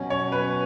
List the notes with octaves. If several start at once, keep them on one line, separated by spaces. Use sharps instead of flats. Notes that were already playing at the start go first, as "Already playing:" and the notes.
Already playing: B2 F#3 C#4
C#5
B4